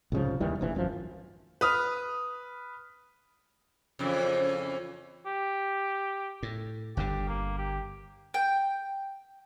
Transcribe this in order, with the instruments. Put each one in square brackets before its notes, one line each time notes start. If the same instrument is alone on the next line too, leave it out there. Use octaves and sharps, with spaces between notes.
[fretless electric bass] C2 G#2 C#3 F3
D#2 D#3 E3 G3
F1 A#1 C3 E3
G#1 F#2 D3 F3
[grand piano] B4 D#6 F6
[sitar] F2 C#3 E3
[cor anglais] G4
[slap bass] A2
[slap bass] G1 G2 D3 [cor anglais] G4
[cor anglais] A#3
G4
[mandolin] G5